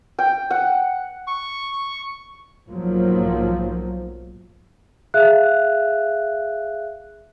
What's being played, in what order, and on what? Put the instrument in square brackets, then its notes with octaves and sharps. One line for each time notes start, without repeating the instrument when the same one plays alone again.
[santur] G5
F#5
[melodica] C#6
[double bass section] B1 G#2 F3 F#3 A#3
[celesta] G#4 E5 F5 F#6